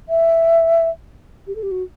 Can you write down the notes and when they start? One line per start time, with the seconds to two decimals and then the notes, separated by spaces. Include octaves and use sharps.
0.09 E5
1.47 G4
1.55 A4
1.63 G4
1.71 F#4